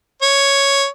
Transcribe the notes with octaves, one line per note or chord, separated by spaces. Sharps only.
C#5